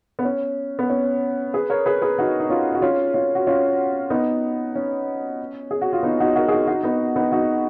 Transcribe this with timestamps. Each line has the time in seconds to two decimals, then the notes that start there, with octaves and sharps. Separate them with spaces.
0.19 B3
0.25 C#4
0.79 B3
0.90 C#4
1.54 G#4 B4
1.70 A#4 C#5
1.86 G#4 B4
2.02 G#4 B4
2.18 D#4 F#4
2.40 D#4
2.49 C#4 F4
2.75 F#4
2.82 C#4 F4
3.14 C#4 F4
3.35 F#4
3.47 C#4 F4
4.10 B3 D#4
4.75 C#4
5.71 G#4
5.81 F#4
5.93 F4
6.03 B3 D#4
6.20 D#4 F#4
6.35 F#4 A#4
6.48 G#4
6.51 D#4 F#4
6.67 D#4 F#4
6.83 B3 D#4
7.16 B3 D#4
7.32 D#4 F#4